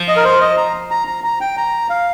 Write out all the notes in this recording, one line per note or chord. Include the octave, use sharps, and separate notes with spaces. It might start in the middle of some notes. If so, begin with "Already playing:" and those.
Already playing: F3
D#5
A#4
C5
D#5
A#5
A#5
A#5
A#5
G5
A#5
F5